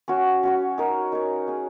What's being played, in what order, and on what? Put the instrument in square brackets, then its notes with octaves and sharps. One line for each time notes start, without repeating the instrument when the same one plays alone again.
[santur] C#4 F#4 C#5
C#4 F#4 C#5
D#4 A#4 C#5
D#4 A#4 C#5
C#4 G#4 D#5